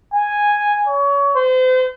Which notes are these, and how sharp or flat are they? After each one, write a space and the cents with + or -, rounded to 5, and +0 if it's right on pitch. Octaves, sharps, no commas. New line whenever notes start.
G#5 -5
C#5 +25
C5 -35